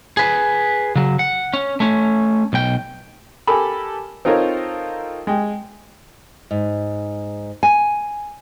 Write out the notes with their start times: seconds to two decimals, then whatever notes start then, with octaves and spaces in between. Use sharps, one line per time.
0.17 G#4 B4
0.96 C#3 F#3
1.19 F#5
1.54 C#4
1.80 A3 C#4
2.53 B1 G5
3.47 G4 A4 A#4 G#5 B5
4.25 C4 D#4 F4 A4 A#4 C#5
5.27 G#3 G5
6.51 G#2
7.63 G#5